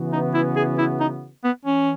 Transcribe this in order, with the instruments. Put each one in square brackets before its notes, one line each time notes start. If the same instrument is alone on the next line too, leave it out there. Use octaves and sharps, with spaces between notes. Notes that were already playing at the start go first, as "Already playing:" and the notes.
Already playing: [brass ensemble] C#3 E3 B3 F#4
[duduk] D#4
E4
G#4
E4
D#4
B3
[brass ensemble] E3 [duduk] C#4